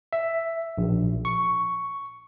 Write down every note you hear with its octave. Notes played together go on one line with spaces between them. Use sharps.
E5
A#1
C#6